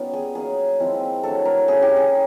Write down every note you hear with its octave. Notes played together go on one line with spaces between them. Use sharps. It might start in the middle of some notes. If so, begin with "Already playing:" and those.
Already playing: G3 B3 C#4 D#4 F4
G#4
F#3 A#3 D#4 G#4
F3 G#3 C4 E4
F#3 A3 D4 A4
A#4
A#3 C#4 E4 G#4
G4
G#4